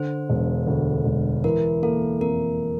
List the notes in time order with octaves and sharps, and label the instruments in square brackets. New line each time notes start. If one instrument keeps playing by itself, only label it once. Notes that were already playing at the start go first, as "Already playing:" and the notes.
Already playing: [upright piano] D3 [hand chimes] C5
[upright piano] E1
D2
E1
[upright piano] E3 [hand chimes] A#4
[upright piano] A#3 [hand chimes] A4
[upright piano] F2 [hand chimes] A#4